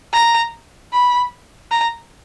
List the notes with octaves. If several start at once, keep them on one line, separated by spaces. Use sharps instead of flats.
A#5
B5
A#5